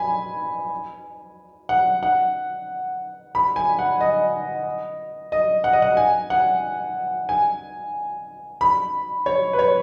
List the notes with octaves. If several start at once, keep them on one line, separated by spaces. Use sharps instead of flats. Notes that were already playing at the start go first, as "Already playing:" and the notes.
Already playing: G#5 B5
F#5
F#5
B5
G#5
F#5
D#5
D#5
F#5
D#5
F#5
G#5
F#5
G#5
B5
C#5
B4
C#5